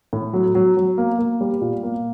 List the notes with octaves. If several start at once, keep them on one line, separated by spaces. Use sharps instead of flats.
A2
F#3
F#3
F#3
A#3
A#3
G3
A#2
A#3